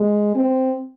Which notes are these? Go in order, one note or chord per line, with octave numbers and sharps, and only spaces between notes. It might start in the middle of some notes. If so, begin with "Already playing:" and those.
Already playing: G#3
C4